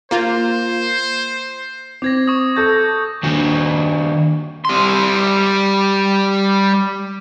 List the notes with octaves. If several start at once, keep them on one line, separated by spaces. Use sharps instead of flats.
A#3 F4 C5
C4 D6 G#6 A#6
C#6 D#6
A4 G6 A#6
D#3 D4 F#4
G3 C6